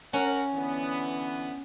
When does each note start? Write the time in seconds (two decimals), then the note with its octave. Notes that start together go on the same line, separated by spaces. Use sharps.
0.13 C#4 A#4 F#5
0.55 D3 E3 B3